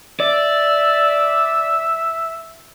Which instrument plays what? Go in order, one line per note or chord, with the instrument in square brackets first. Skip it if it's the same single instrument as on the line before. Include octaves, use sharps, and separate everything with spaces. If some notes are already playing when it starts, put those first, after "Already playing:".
[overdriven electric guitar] D5 [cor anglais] E5